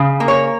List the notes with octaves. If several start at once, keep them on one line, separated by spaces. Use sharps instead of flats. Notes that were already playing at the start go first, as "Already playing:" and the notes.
Already playing: C#3
A#3
C#5